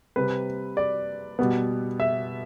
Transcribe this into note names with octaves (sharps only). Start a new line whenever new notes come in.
C3 G3 C4 B4
D5
B2 G3 B3
E5